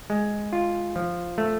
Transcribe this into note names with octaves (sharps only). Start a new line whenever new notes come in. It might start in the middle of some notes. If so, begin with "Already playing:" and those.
G#3
F4
F3
A3